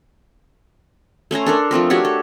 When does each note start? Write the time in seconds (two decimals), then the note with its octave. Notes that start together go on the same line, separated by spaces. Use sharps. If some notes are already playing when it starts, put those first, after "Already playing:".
1.31 A3 C#4 C5 A#5
1.46 D4 A4 A#4
1.71 F3 A3 C4 A#4
1.90 D4 F#4 G4 C#5
2.05 A4